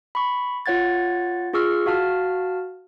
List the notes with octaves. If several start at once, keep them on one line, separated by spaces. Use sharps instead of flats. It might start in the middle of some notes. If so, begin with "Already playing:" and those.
B5 C#6
F4 C#5 F#5 G#6 A6
F4 G#4 C#6 E6 F6
F#4 F5 A5 F6